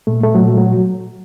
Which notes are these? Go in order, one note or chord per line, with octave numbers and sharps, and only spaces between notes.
A#2 A3
A3
F#3
A#2
F#3